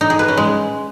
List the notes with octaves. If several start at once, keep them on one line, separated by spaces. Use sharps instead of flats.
D#4
G#4
B4
C#4
G#3